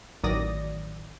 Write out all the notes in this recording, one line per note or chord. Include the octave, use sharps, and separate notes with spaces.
A1 D#3 F#3 D5 D#6 A#6